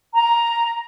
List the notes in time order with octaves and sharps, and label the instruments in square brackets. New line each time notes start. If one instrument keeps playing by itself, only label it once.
[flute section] A#5